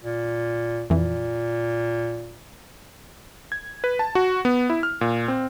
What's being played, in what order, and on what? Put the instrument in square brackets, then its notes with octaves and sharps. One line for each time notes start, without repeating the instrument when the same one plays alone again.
[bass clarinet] A#2
[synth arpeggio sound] F2 E3 [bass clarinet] A#2
[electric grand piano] G#6
B4
A5
F#4
B3
E4
F6
A#2
C4